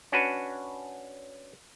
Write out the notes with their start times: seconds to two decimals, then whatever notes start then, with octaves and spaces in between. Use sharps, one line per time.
0.12 C#4 D4 F#4 B4